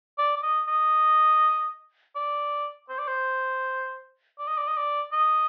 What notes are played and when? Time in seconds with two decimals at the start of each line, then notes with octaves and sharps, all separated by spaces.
0.18 D5
0.36 D5
0.43 D#5
0.68 D#5
2.15 D5
2.89 C5
2.98 D5
3.07 C5
4.39 D5
4.48 D#5
4.57 D5
4.68 D#5
4.77 D5
5.12 D#5